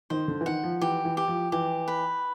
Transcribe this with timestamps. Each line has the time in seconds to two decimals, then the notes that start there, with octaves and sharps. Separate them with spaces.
0.10 D#3 C5
0.28 D3
0.41 E3
0.46 D#3 F#5
0.64 F3
0.81 E3 G4
1.05 E3
1.17 G4
1.28 F3
1.52 E3 G4
1.88 B4